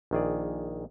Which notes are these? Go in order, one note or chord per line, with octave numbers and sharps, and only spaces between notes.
A#1 D#3 G#4 D5